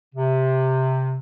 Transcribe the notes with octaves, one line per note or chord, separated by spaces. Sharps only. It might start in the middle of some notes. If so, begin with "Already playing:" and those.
C3